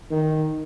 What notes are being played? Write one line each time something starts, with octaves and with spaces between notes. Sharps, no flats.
D#3